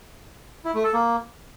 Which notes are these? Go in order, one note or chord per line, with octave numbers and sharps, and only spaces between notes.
E4
A3
A4
A#3